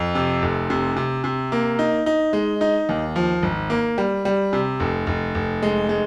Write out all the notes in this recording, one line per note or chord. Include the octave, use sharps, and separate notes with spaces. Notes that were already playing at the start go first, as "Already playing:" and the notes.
Already playing: F2
C3
F1
C3
C3
C3
A#3
D#4
D#4
G#3
D#4
D#2
F3
G#1
A#3
G3
G3
C3
F1
F1
F1
G#3
G#3